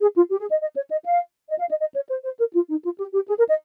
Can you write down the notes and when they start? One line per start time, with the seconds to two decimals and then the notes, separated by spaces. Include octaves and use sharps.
0.01 G#4
0.16 F4
0.31 G4
0.40 G#4
0.50 D#5
0.61 D#5
0.76 C#5
0.90 D#5
1.04 F5
1.49 D#5
1.59 F5
1.70 D#5
1.80 D#5
1.94 C#5
2.09 C5
2.24 C5
2.39 A#4
2.54 F4
2.69 D#4
2.84 F4
2.98 G4
3.13 G4
3.27 G#4
3.38 A#4
3.48 D#5